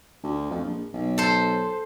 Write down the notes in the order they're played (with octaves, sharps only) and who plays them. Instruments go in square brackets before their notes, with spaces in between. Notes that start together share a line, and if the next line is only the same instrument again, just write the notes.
[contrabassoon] D2
F2
A#1
B1
[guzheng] A4 C5